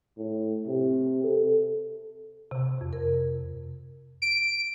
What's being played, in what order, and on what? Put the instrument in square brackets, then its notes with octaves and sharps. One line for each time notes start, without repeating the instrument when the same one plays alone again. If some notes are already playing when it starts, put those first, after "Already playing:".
[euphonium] A2
C3
A4
[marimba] C3
F2
A#4
[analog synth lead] D7